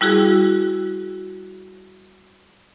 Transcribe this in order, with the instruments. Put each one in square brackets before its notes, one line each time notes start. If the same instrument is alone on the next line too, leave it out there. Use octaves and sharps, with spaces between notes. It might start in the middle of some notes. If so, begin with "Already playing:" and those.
[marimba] G3 E4 F#4 G#4